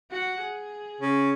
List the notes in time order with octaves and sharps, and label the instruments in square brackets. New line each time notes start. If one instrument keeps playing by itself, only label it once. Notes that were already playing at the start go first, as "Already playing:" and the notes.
[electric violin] F#4 F#5
G#4
[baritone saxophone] C#3